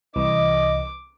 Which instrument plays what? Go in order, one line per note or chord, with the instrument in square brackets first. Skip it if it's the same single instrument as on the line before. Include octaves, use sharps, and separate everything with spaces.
[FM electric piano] C2 E3 [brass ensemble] D#5 [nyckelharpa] D6